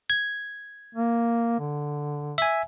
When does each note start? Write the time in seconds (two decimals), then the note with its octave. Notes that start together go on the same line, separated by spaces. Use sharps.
0.10 G#6
0.95 A#3
1.59 D3
2.38 E5 G#5